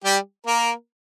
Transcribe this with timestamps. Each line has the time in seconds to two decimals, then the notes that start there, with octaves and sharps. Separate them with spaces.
0.04 G3 G4
0.46 A#3 A#4